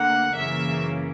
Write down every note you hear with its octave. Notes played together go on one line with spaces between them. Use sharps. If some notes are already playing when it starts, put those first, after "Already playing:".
Already playing: D2 D3 A#3 F#5
F#2 C#3 E3 A#3 E5